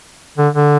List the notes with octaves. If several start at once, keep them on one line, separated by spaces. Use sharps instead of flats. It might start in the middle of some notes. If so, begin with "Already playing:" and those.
D3
D3